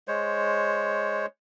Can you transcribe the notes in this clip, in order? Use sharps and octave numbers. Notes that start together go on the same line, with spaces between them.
G#3 C5 C#5